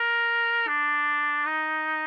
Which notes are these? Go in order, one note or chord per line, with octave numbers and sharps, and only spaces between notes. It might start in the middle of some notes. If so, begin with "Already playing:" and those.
Already playing: A#4
D4
D#4